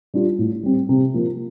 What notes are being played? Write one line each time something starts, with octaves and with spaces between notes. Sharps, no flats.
G3 D4 F4
A2
G3 C4
C3
F3 A#3